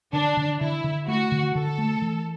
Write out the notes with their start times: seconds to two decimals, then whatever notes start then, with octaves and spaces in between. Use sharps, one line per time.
0.13 D3 D4
0.37 D3
0.60 D3 E4
0.84 D3
1.07 A3 F#4
1.32 D3
1.54 D3 A4
1.78 A3
2.02 E3